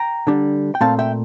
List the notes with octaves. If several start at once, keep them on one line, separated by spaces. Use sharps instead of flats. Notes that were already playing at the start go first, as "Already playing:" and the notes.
Already playing: G5 A#5
D3 G3 D4
G5
A#2 A3 C4 F5 A5
E5 G5